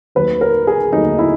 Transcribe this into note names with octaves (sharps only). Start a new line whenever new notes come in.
D#2 D#3 F#3 A3 B4
A#4
G#4
D#2 D#3 F#3 A3 D#4
E4